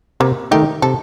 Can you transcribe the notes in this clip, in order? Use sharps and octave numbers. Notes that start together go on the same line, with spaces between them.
C3 A#3
D#3 A3 D#4 G4
C3 A4